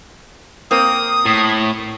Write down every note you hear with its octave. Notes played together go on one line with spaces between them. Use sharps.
A#3 C4 A#4 D#6
A2